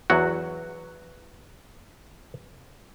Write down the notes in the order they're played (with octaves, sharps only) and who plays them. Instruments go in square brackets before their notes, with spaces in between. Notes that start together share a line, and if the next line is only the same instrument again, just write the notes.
[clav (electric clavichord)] E2 F#3 F#4